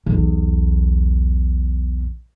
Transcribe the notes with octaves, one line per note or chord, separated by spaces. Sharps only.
B1 E2